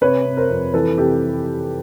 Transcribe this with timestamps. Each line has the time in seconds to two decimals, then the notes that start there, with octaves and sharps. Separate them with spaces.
0.01 C3 B4 C#5
0.25 C3
0.37 A#4 C5
0.49 F2
0.74 E3 A4 B4
0.98 C3 G4 A4